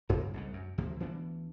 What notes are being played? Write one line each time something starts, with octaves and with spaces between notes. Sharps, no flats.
F#1 G2 C#3 A#3
C2 G#2 C#3
F#2
D2 C3 F3 A#3
D2 E3 B3 D4